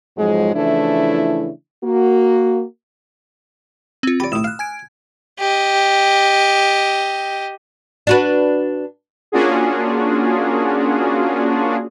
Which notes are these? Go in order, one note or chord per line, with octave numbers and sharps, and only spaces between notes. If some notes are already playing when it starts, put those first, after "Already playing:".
F2 G#2 F3 F#3 G#3
C#3 E3 F3 A3 D4 E4
A#3 F#4
C4 F4
G4 D5 B5
A1 A2 D#6 E6 E7
F5 F6 F#6
G#5 G#6 D7
G4 D#5
D4 F#4 B4
A#3 C#4 D4 F4 F#4 G#4